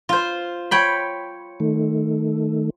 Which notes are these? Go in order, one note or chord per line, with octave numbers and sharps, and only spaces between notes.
F4 C5
C#5 G5 B5
D#3 A3